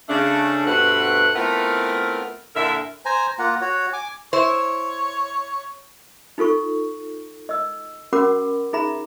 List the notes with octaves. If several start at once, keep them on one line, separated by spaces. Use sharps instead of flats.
C#3 A3 D4
G2 B2 A3 C4 B4 F#5
A3 B3 C4 E4 F4 A#4
A#2 D3 E4 A#4 E5
C5 G#5 A#5
A#3 F4 F#5 A#5
F#4 C#5
G#5 D6
E4 C5 C#5
D#4 F4 A4 C#6
D#5 E6
C#4 F#4 A#4 F#5 B5 D6
D#4 G#4 E5 A#5 B5